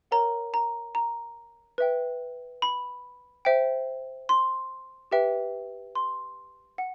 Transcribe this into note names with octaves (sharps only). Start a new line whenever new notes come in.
A#4 C#5 F#5 A#5
A#5
A#5
B4 E5 G5
B5
C5 E5 G5
C6
G4 B4 E5 G5
C6
F#5